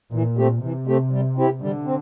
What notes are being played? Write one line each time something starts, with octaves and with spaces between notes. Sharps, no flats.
A#2 E3
A3 C4 G4
C3 E3
A3 C4 G4
G3
C4 E4 G4
D3 G3
C4